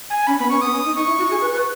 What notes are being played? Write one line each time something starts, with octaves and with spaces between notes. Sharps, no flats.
G#5
C#4 B5
B3 B5
C#4 C#6
B3 D#6
C#4
D#4
D#4 C#6
E4
F#4
G#4
B4
B4